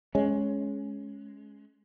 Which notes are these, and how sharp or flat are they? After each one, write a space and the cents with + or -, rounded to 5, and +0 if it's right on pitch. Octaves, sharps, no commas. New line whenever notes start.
G#3 +20 C#4 +0